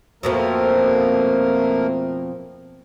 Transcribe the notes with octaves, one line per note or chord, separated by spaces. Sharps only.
F2 B2 F3 A3 A#3 A#4